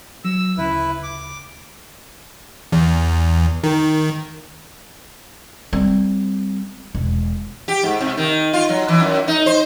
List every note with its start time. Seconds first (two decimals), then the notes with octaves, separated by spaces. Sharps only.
0.24 F#3 E6
0.58 D2 C#3 E4 B4
1.03 D6
2.72 E2
3.63 D#3
5.73 G3 C4
6.95 E1
7.68 G4
7.83 G#2
8.01 C3
8.17 D#3
8.53 F4
8.69 F#3
8.88 E3
9.00 F#2
9.28 D#4
9.46 C5